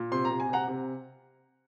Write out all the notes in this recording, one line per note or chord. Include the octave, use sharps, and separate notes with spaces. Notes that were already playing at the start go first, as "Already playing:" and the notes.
Already playing: A#2
C3 C6
A#5
C3
G#5
C3 F#5 A#5
C3